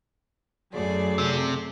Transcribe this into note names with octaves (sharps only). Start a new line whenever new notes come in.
F#2 F#3 A3 G#4 D5
C3